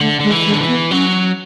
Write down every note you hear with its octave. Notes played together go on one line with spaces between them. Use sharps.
D3 A3
D3 G#3
E3
G#3
D3
E3
B3
F#3 C#4